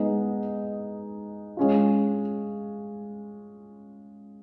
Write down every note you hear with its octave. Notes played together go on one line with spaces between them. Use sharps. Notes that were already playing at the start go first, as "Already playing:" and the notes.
Already playing: G#3 B3 D#4
G#3 C#4 F4